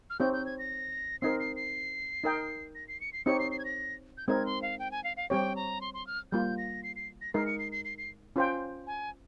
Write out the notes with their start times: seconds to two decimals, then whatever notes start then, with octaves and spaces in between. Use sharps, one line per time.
0.10 F6
0.20 C4 D#4 G4 C#5 G6
0.33 G6
0.46 G#6
0.59 A#6
1.22 C4 D#4 A#4 C7
1.40 C7
1.56 C7
2.24 D#4 A#4 D#5 G5
2.75 A#6
2.88 C7
3.01 C#7
3.13 C7
3.26 C4 D#4 G4 C#5 C#7
3.40 C7
3.51 C7
3.59 G#6
3.65 A#6
4.17 G6
4.28 G#3 C4 D#4 A#4 G#6
4.46 C6
4.62 F5
4.79 G5
4.91 G#5
5.04 F5
5.17 F5
5.30 G3 C4 G4 C#5 G5
5.56 A#5
5.81 C6
5.94 C6
6.07 F6
6.32 G3 A#3 F4 G6
6.58 A#6
6.83 C7
6.96 C7
7.21 A#6
7.34 G#3 D#4 A#4 C7
7.46 C#7
7.59 C7
7.72 C7
7.85 C7
7.98 C7
8.36 C#4 F4 C5 G5
8.87 G#5